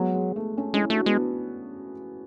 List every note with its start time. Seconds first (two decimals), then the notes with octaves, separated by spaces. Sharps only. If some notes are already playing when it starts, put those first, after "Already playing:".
Already playing: F#3 G#3 B3
0.14 G#3
0.36 A3
0.58 A3 C#4
0.74 G#3 C#4 E4
0.90 A3 D4 F#4
1.06 G#3 B3 D4